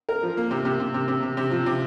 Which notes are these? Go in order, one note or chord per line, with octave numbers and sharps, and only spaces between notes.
A#4
F3
A#3
C3
C3
C3
C3
C3
C3
C3
F3
C3